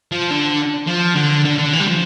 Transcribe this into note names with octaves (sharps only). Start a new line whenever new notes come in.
F3
D3
F3
D3
D3
D3
E3
G3
F3